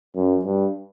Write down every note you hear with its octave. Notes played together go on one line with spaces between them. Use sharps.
F#2
G2